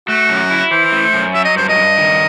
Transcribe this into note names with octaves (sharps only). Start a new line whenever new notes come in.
A3 F#4
F#2
E4
E3 C5
A3
F#2
F#3 E5
D#5
G2 C5
D#5
G2
D#3